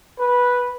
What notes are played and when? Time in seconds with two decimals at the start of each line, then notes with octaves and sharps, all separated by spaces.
0.19 B4